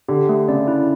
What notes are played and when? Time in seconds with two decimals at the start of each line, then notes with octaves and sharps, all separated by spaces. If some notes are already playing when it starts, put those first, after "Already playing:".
0.08 D3 G4
0.29 A3
0.48 C#3 D5
0.68 E4